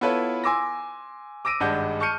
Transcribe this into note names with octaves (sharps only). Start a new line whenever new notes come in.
B3 E4 F4 A4 B4 C#5
G#5 C6 D6 E6 A#6
D6 E6 A#6 D7 D#7
G#1 G2 G#3 D4 F#5 G6
A5 C#6 F6 G6 C#7 D#7